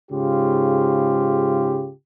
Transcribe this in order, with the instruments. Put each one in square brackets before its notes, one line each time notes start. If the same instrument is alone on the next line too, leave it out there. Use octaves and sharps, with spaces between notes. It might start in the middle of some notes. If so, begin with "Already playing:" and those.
[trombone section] G#2 C#3 F4 G4